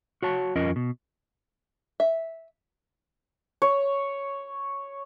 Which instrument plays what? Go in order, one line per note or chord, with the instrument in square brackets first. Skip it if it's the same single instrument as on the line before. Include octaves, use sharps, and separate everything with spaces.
[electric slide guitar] F#4 C#5 A5
F2 C#4 F4 A#4 D#5
B2
[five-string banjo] E5
[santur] C#5